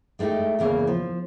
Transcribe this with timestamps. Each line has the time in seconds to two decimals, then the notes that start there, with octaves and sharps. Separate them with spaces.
0.19 G#3 A3 B3 D#4 G4
0.59 E2 C#3 A#3
0.87 F3